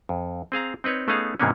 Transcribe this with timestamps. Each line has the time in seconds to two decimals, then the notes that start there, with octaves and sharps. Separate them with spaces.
0.09 F2
0.52 C4 G#4 F5 A#5
0.84 C4 D#4 B4 C#5
1.08 A3 B3 C#4 D#4 G#4 F5
1.40 G#2 C3 E3 A#3 B3 C#4